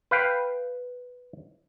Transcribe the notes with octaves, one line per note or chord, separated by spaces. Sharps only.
B4 F5 G5